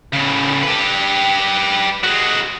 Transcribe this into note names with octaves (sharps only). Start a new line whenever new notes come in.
A2 C#3
G4 B4
G#3 F#4